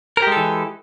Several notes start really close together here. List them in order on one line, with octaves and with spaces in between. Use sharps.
A#4 G4 G#3 A4 E3